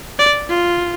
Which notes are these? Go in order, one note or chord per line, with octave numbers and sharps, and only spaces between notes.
D5
F4